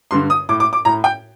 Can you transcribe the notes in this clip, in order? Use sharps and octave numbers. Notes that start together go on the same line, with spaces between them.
G2 D3 C6
D#6
A2 D6
D6
D6
A2 A#5
G5